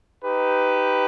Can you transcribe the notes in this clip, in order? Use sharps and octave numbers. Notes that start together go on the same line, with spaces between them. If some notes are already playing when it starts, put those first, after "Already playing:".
D#4 G4 B4